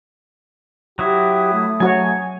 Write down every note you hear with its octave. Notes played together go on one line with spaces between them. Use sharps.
F#3 E4 G4 D#6
A3
F#3 F#4 C#5 G#5